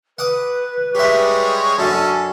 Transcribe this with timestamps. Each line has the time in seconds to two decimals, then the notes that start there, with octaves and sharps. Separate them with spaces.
0.19 B4 F#5 D6 D#6
0.95 G3 G#3 G4 C#5 E5
1.79 F#2 D3 C#4 A4 G#5